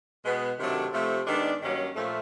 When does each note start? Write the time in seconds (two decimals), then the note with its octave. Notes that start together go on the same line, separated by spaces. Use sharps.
0.24 B2 G#3 B3
0.58 C3 D#3 F#3 A3 D4
0.93 C3 F3 A3
1.27 D#3 G#3 B3 D4
1.61 G2 D#3 F#3 A#3 C#4
1.96 A#2 F3 A3